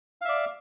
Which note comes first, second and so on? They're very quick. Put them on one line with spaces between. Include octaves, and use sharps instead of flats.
F5 E5 D5